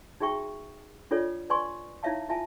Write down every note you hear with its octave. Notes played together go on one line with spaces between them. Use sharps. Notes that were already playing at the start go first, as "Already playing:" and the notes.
D#4 F#4 G#4 E5 G5 C#6
D4 F4 A4 C#5 D5
B4 D5 G#5 C6 C#6
D#4 E4 C#5 E5 F5 A5
E4 F4 E5 G#5 A5